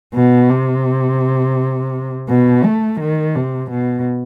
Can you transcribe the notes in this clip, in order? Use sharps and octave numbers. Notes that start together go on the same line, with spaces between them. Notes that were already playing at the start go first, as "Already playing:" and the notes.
B2
C3
B2
A3
D#3
C3
B2